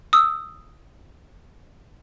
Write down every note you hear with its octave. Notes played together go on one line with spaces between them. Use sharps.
D#6 E6